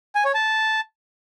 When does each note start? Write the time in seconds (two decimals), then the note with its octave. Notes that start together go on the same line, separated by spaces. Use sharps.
0.15 G#5
0.25 C#5
0.35 A5